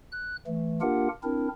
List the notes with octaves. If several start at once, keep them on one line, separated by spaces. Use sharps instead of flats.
F#6
E3 A3
A#3 D4 F4 G4 A#4 F#5
C4 D4 E4 A#4